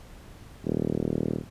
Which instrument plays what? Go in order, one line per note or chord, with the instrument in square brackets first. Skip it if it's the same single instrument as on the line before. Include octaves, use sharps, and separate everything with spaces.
[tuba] D#1